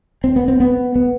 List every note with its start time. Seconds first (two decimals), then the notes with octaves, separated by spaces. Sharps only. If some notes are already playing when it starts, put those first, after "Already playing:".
0.24 C4
0.36 B3
0.48 C4
0.60 B3
0.96 B3